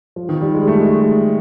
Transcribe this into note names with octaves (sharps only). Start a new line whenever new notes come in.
F3
D#3
G3
G#3
A3
G#3